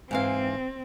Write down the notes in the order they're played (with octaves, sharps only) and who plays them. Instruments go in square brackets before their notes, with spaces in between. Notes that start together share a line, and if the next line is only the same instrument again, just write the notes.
[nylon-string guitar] G#2 E3 F5 [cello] C4